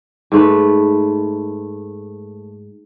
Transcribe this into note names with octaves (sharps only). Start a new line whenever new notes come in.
G#2 A3 B4